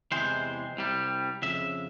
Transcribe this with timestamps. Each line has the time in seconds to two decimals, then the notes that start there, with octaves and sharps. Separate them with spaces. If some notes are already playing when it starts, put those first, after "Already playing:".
0.12 E2 C3 E3 G#3 C5
0.77 C2 C3 G3
1.42 F2 C#3 E5